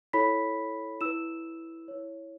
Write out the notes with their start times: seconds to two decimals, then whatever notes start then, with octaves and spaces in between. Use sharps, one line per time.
0.13 E4 A4 C#5 B5 B6
1.01 E4 B4 E6 E7
1.88 E4 C#5